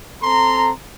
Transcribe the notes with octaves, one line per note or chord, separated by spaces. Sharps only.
C4 A4 A#5 C6